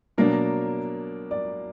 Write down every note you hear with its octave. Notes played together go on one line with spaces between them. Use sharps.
B2 F#3 A#3 D4 A#4
D5